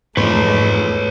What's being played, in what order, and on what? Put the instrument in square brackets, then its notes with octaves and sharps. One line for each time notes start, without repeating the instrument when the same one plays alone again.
[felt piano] E1 F2 [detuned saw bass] G#2 [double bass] A3 [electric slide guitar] B4 C#5